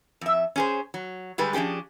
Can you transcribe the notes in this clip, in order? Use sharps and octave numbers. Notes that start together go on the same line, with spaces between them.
F2 E5
C#4 G#4 C5
F#3
D3 G3 G#3 G4 B4
F3 C#4 D4 G4 G#4